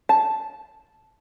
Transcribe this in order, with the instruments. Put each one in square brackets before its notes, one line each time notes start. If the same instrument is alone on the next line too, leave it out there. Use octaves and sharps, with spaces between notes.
[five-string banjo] A5